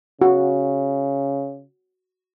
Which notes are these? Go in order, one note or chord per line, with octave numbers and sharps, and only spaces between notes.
C#3 F#4